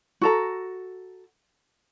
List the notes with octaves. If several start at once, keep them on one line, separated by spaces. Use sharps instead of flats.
F#4 A4 A#5